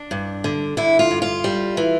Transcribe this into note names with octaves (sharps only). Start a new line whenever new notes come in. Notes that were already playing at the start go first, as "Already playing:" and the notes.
Already playing: D4
G2
D3
D3 E4
F4
G2
F4
G3
E3